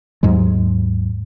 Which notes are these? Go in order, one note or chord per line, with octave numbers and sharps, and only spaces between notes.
D#2 G#2 F#3 G#3